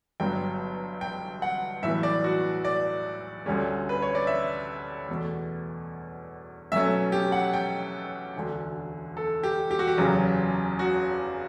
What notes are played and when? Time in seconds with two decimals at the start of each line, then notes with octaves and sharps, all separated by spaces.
0.20 G1 G2 F#3 B3 G5
1.01 G5
1.42 F#5
1.83 B1 A2 E3 G3 B3 E5
2.03 D5
2.24 F#4
2.65 D5
3.46 D2 D3 G3 C#4
3.89 B4
4.02 C#5
4.15 D5
4.27 E5
5.08 E2 B2 A3
6.72 B1 B2 F#3 A3 C#4 E5
7.12 G4
7.32 F#5
7.54 G5
8.35 E1 D2 D3
9.17 A4
9.43 G4
9.71 G4
9.79 F#4
9.88 G4
9.98 F#1 E2 C#3 F#3 C#4
10.79 F#4